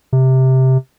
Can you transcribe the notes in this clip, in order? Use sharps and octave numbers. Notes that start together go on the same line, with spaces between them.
C3